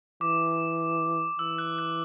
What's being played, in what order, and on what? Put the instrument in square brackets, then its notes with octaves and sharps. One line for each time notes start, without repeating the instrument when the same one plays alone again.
[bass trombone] E3 [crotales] D6
[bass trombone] E3 [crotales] E6
[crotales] F#6
F#6